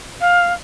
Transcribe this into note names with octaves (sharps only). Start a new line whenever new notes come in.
F5